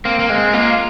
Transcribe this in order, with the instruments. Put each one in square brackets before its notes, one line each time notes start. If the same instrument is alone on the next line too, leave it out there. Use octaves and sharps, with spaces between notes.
[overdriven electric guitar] A#3 [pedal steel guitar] C4
[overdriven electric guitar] A#3
[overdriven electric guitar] G#3 [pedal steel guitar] C4
[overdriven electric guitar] A#3 [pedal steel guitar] F4